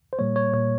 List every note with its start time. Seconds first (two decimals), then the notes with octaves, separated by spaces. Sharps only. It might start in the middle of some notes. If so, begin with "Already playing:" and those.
0.13 C5
0.19 A#2 G3 A#3 C#5
0.36 C#5
0.53 A#2 G3 A#3 C#5